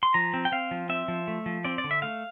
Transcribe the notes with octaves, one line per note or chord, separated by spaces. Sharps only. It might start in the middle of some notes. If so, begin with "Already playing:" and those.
C6
F3 A#5
C4
G5
C4 F5
F3
C4 E5
F3
A3
F3
C4 D5
D5
D3
E5
A3 F5